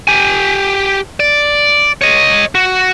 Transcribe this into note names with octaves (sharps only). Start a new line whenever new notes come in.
G4 G#5
D5
C#5 D#5
F#4